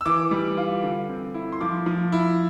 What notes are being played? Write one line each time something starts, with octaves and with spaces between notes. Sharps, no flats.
E6
E3 D6
G3
F4
D3
C4
E4
C6
F3 D6
F3
E4